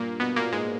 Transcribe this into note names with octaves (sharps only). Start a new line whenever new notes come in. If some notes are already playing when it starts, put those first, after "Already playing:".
Already playing: G2 A#2 A#3
B2 B3
A#2 A#3
G#2 G#3